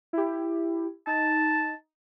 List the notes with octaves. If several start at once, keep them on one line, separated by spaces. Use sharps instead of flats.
E4 G4
D#4 A5